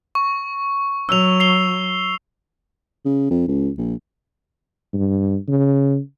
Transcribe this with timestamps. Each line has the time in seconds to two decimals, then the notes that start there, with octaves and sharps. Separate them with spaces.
0.15 C#6
1.09 F#3 E6 F7
1.40 C7 F7 G7
3.05 C#3
3.31 F2
3.48 C#2
3.78 A#1
4.93 G2
5.48 C#3